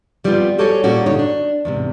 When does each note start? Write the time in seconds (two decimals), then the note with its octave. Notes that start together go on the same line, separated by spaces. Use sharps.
0.24 F3 G3 B3 C4 D#4 F4
0.58 F#4 G4 A4 C5 C#5 G#5
0.84 A#2 G3 C#4 F#4
1.06 G2 D3 D#4 C#5
1.19 D4
1.65 E2 G#2 C3